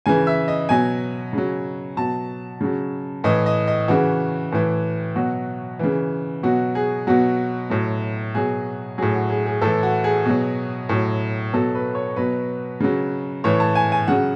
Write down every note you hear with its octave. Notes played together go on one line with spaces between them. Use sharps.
C#3 E3 G#5
E5
D#5
B2 F#3 G#5
C#3 F#3
B2 F#3 A5
C#3 F#3
A2 E3 D#5
D#5
D#5
C#3 E3 F#4
A2 E3
B2 F#3 F#4
C#3 E3
B2 F#3 F#4
G#4
B2 F#3 F#4
A2 F#3
B2 F#3 G#4
A2 F#3 G#4
F#4
G#4
G#4
A2 E3 A4
F#4
G#4
B2 F#3
A2 F#3
B2 F#3 A4
B4
C#5
B2 F#3 B4
C#3 F#3
A2 E3 C#5
A5
G#5
G#5
C#3 F#3 F#5